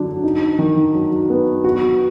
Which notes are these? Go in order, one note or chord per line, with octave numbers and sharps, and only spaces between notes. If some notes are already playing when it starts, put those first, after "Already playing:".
Already playing: D3 F#3 D4
D#4
D#3
F#3
B3
F#4